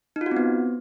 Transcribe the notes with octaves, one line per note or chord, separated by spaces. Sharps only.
D#4
F4
F#4
C4
B3